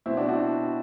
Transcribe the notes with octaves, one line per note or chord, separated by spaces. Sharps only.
B2 C4 E4
D4 F#4
D4 F#4